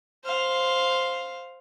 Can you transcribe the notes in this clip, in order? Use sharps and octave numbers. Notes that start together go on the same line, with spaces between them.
C5 F5